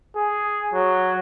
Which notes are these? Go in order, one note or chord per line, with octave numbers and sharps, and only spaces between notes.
G#4
F#3